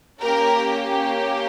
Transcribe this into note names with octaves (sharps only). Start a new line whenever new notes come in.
A#3 C#4 G4 A#4